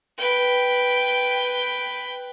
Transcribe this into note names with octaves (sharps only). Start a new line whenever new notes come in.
B4 G5